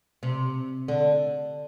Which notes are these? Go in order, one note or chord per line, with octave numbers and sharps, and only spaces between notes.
C3
D3